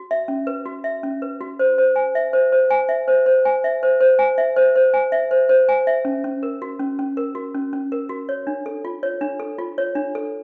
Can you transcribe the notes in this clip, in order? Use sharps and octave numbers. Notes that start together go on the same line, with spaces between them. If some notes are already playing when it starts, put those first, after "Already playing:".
Already playing: F#4
E5
C#4
B4
F#4
E5
C#4
B4
F#4
C5
C5
G#5
E5
C5
C5
G#5
E5
C5
C5
G#5
E5
C5
C5
G#5
E5
C5
C5
G#5
E5
C5
C5
G#5
E5
C#4
C#4
A#4
F#4
C#4
C#4
A#4
F#4
C#4
C#4
A#4
F#4
C#5
D4
A4
F4
C#5
D4
A4
F4
C#5
D4
A4